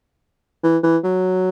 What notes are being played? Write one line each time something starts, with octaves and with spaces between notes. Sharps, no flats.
E3
E3
F#3